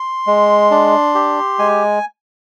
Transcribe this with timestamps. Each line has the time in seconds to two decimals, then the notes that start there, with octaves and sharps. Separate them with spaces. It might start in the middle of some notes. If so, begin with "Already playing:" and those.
Already playing: C6
0.27 G#3
0.71 D4
1.15 G4
1.59 G#3 G#5